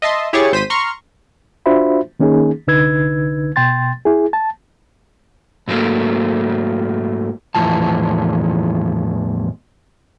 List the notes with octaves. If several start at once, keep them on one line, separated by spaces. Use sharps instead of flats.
D#5 E5 A5 C6
E4 G4 G#4 C#5 C#6 A6
G#1 C5 B6 D#7
A#5 C6 C#6 F6
D4 F4 F#4 C5 E5 B5
D#3 A#3 C#4 D#4 G#4
C2 D3 D#4 B4 E6 G#6
B2 G5 C6 A6
E4 G#4
A5
G#2 F#3 A3 A#3
E2 A2 E3 F3 A5